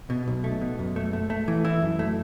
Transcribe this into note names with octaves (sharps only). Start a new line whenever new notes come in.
B2
B1
A3
B2
F#2
A3
A3
A3
E3
E4
F#2
A3